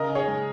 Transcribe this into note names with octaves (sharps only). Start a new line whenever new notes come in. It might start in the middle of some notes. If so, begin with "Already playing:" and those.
Already playing: C#3 A#4 D#5
C#4
G#4 C#5
G#3